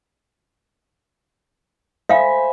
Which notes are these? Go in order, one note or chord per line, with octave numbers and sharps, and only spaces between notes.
C5 E5 F5 G#5 B5